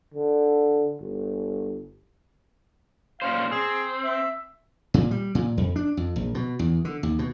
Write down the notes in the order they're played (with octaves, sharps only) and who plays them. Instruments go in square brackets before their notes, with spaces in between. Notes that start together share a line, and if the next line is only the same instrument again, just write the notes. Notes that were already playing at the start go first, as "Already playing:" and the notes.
[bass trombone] D3
G1
[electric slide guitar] A#2 C#4 C5 [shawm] F5
[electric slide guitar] C4 [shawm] G#4
[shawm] E5
[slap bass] A#2
G3
A#2
F2
D4
F2
A#1
B2
E2
D3
D#2
B2